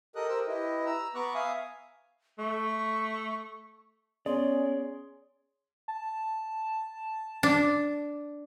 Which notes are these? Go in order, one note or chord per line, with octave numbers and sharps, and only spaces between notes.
G4 A4 A#4 D#5 D#6 F#6
G4 A#4 C5 E6
E4 G4 B4 D#5
A#5 E6
B3 B4 A#5 C#6 D6 F#6
E5 F5 G#5 D#6
A3 C#6
B3 C#4 G#4 C#5 D5 C6
A5
D4